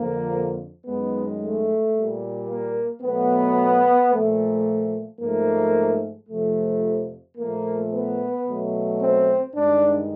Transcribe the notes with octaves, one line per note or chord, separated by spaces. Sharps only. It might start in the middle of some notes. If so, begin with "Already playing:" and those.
Already playing: F2 D3 F3 A#3
F#2 D#3 G#3 B3
A3
A#2 G3
A#3
B2 F#3 A3 B3
A#2 F3 A3
G#2 F3 A3 A#3
F2 C3 F3 A3
A#2 F3 A3 A#3
B3
B2 F#3 A3
C4
G2 D#3 G#3 D4